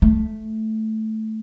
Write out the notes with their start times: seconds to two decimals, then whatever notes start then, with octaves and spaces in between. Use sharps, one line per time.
0.02 A3